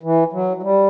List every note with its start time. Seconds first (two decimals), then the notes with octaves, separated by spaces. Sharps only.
0.03 E3
0.33 F#3
0.57 F#3
0.63 G3